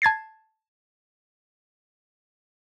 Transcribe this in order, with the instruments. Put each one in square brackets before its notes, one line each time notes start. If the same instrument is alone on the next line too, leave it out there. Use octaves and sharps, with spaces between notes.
[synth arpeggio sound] A5 G#6 A6 C7